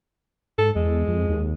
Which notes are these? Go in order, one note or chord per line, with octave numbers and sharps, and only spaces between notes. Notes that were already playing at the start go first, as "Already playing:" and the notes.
G#2 A4
E2 G#3
F2
D#2